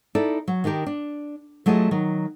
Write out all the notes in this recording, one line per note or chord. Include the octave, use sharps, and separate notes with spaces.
D#4 E4 A4 D5
F#3
D#3 D4 D#4 G4 A#4
D4
F#3 A3 F4 G#4 D#5
D#3 F#3